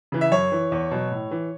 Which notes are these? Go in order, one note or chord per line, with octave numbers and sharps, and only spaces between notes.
C#3 E3
E5
F#2 C#5
E3
E2
B2 F#3
A2
E3